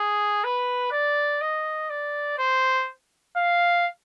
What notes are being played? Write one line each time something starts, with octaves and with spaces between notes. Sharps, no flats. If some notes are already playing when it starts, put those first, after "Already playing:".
Already playing: G#4
B4
D5
D#5
D5
C5
F5